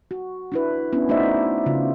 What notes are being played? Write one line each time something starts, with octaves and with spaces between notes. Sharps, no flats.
F#4
D4 E4 B4
B3 C#4 D4 E4
A3 D#4 F#4 C5 D5 E5
C#3 F4